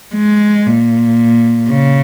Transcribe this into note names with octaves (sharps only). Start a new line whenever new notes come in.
G#3
A#2
C#3